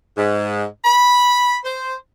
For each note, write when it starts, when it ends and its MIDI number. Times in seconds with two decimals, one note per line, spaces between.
0.18 0.64 44
0.85 1.56 83
1.65 1.94 72